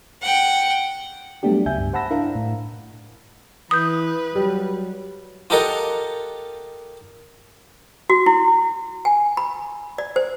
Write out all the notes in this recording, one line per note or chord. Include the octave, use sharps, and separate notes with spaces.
F#5 G5
F#3 G3 A3 B3 D4 G4
C#2 E5 G#5 G6
G2
C5 F#5 A5 B5 E6 A#6
D4 E4 A#4 F5 F#5
A2
E3 B4 D#6 G6
F#3 G3
F4 G4 A4 A#4 D#5 F#5
F#4
E4
G#5
B5
D5
C5